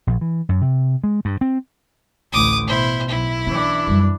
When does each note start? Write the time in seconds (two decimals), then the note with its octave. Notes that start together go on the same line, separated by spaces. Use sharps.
0.07 A#1
0.21 E3
0.49 F#2
0.62 C3
1.04 G#3
1.25 G2
1.41 C4
2.32 A1 D2 D6 D#6
2.68 B2 E4 C5
3.09 B1 E4
3.47 E3 C#4 D4
3.87 F#2 G3